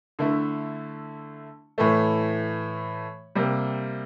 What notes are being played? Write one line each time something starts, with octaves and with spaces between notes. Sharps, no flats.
D3 A3 E4
A2 E3 A3
C3 G3 A#3